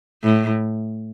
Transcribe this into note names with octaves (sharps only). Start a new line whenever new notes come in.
A2